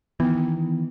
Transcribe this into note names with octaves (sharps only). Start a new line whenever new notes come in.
D#3 E3 B3